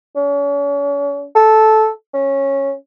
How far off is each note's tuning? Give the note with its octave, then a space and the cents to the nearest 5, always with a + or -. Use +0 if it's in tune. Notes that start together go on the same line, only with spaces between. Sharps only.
C#4 +40
A4 -10
C#4 -10